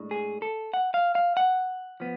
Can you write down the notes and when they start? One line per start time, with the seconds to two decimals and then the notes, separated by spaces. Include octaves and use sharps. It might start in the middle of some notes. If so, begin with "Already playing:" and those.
Already playing: A2 G#3 D4
0.11 G#4
0.42 A4
0.73 F#5
0.94 F5
1.15 F5
1.37 F#5
2.00 F3 B3